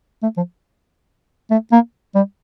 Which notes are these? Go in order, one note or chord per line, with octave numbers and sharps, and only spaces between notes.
A3
F3
A3
A#3
G3